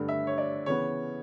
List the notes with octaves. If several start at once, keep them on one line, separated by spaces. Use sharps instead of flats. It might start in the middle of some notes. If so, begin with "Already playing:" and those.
Already playing: G2 D3 A3
E5
C#5
D5
C#3 E3 B3 C#5